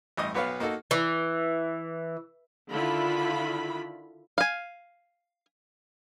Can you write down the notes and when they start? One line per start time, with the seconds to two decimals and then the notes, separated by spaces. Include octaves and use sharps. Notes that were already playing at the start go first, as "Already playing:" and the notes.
0.17 A1 G2 D#5 D#6
0.35 B1 B3 B4 C#5 F5
0.60 A#3 D#4 F#4 A4
0.91 E3
2.70 D3 D#3 E4 F4 B5
4.38 F5 G#5